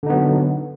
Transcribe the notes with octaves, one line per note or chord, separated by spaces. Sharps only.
D3 F#3 B3 D#4